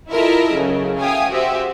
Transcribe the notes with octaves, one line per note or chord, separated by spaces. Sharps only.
E4 F4 A4 A#4 D#5 E5
C#3 F#3
E5 F5 G5 G#5 D#6
F#4 G4 C5 E5